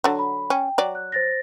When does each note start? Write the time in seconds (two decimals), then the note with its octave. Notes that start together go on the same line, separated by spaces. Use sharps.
0.04 D3 F#3
0.19 B5
0.50 C#4 G5
0.78 F#3 D5
0.95 F#6
1.12 C5 A6 A#6